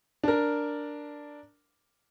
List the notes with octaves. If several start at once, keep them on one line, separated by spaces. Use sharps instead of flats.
D4 A#4